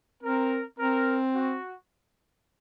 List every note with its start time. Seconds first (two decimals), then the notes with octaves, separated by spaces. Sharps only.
0.23 C4 A#4
0.79 C4 A#4
1.34 F#4